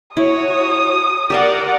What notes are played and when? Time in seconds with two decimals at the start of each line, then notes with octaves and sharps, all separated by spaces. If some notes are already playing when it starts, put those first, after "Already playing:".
0.17 E4 F#4 C#5 D#6
1.30 G4 A#4 D5 E5 F#5 C6